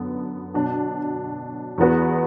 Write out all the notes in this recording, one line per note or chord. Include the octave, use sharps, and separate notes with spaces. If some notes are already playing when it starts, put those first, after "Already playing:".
Already playing: F#2 D3 B3
B2 F#3 D4
E2 E3 B3 F#4 B4